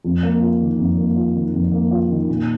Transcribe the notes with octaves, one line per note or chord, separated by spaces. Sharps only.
F2
A#3
F4
D#3
F2
A#3
F4
D#3
F2
A#3
F4
D#3
A#2